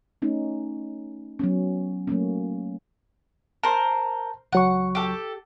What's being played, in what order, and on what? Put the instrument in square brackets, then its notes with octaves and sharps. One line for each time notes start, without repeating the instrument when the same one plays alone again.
[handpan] A3 C#4 D#4
F#3 B3 C#4
F#3 A3 A#3 C#4
[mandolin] A#4 C5 [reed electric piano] A5
[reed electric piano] C#2 F#3 C#6 [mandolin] F#5
[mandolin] G4 A4